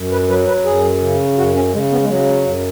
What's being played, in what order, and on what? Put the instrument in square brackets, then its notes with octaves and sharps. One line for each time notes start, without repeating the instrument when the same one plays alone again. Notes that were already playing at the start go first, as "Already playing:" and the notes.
Already playing: [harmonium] F#2
B4
F#3 B4
B4
F#2 G#4
C#3
F#2 F#4
C#4
C#3 G#3
B3
G#3
C#3 F#3
F#2